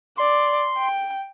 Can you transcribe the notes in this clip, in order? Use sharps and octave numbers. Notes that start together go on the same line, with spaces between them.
D5 C6
G5